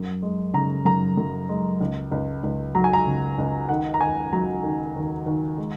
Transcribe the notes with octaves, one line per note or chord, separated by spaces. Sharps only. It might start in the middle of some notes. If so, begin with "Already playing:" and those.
Already playing: F#2
G#3
C#3 A#5
F#2 A#5
F#2
G#3
C#2
C#2
C#2
F#3 A#5
G#5
A#5
C#3
C#2
D#3 F#5
A#5
D#2 G#5
F#3 A#5
D#3
D#2
D#2
G#3